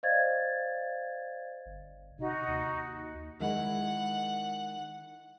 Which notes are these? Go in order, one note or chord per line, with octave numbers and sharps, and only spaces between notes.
C5 D5 D#5 F5 G#6 A6
G1
C3 D#4 F#4
D#2
D#3 G#3 E4 F#5